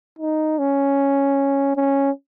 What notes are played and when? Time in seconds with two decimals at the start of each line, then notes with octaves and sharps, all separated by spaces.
0.19 D#4
0.59 C#4
1.76 C#4